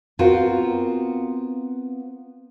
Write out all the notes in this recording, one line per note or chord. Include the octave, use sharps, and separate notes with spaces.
B3 C4 F4 F#4 A#4